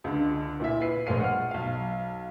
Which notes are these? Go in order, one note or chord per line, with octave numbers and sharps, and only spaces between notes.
C#2 D3
A#2 E4 F4 E5
B4 C7
A#1 G#3 A#3 F5 C7 D#7
F#5 F6
B1 F5